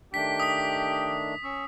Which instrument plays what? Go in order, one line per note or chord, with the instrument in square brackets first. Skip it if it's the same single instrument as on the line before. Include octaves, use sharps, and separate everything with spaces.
[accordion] D#3 A3 D4 [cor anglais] G4 [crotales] B6
[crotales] D#6 B6
[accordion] C#4 C#6 E6